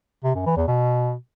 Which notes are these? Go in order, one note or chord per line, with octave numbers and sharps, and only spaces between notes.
C3
F#2
E3
E2
B2